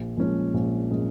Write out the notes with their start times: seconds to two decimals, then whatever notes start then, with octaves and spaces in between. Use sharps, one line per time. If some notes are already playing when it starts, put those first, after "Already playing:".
Already playing: A#1
0.17 A#2 F3 G#3 C#4
0.54 A#1
0.90 A#2 F3 G#3 C#4